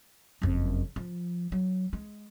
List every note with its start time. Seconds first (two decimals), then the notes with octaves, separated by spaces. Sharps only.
0.42 F#1 F2
0.96 F3
1.52 F#3
1.93 G#3